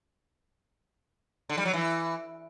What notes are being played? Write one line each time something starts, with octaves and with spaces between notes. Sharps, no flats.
D3
G3
F#3
E3